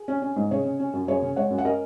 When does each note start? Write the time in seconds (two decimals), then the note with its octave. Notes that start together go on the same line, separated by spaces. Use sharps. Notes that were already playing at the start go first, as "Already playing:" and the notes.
Already playing: G#4
0.08 C#4
0.22 C#4
0.36 G#2
0.51 C#3 G#4 C#5
0.65 C#3
0.79 C#4
0.93 F#2
1.07 F#2 G#4 C#5
1.22 C#3
1.36 G#3 C#5 F#5
1.50 F#2
1.58 F#5
1.65 C#4 A#4 D#5